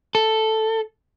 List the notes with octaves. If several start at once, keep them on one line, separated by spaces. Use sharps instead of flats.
A4